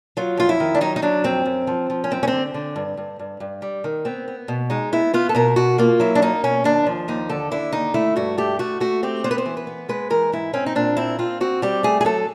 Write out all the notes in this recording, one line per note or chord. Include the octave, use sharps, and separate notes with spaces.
F#3 F4
F2 F4
E4
D#3
D4
F#3 D#4
D#4
F#3 D4
F2 C4
F#2
F3
F3
C#4
F#2 C4
C#4
D3 C4
D3
G2
G2
G2
G2
G3
D#3
B3 C4
B3
B2
G#3 D#4
B3 E4
B3 F4
A4
B2 A#4
B2 F#4
A#3 F4
F#3 E4
D4
A#3 D#4
B2 C#4
D#2 D4
F3
D#2 D#4
D3 A4
D3 E4
D#2 D#4
A3 E4
G2 F#4
A3 G4
A3 F#4
A3 F#4
C4 G4
B3 C5
B4
C5
E3
B4
B3
G#3 B4
E3 A#4
G#2 E4
C4 C#4
D#4
A#2 D4
C4 E4
C4 F4
C4 F#4
G3 G4
A3 G#4
G#4
F#3 A4